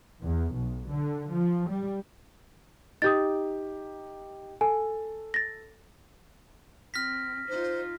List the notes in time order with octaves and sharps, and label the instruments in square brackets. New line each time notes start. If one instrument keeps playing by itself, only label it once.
[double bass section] E2
B1
D3
F3
G3
[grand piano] D#4 G4 [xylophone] D#6 G6 A6
[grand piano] A4 [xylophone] G#5
[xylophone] A6 A#6
[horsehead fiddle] C4 [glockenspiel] F6 A#6 B6
[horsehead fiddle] D#4 F4 [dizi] C5